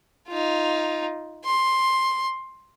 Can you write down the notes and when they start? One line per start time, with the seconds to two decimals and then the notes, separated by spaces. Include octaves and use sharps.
0.28 D#4 F4
1.45 C6